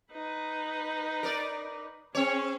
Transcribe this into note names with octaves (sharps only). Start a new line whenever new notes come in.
D#4 B4
A#4 D5
C4 C#4 G#4 C#5